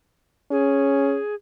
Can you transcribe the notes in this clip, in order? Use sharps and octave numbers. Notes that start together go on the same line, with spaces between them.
C#4 G#4